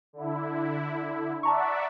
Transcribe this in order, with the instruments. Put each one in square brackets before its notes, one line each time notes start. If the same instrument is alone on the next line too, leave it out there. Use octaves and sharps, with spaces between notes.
[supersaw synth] D3 E4
[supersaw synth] D5 E5 F#5 [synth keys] A5 A#5 C#6